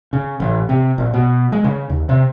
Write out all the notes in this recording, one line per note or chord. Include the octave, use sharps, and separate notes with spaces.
C#3
A1
C3
A#1
B2
G#3
C#3
D#2
C3